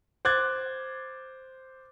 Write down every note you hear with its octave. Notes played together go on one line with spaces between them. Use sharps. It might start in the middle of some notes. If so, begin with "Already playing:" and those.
C5 D6 F#6 G#6 A6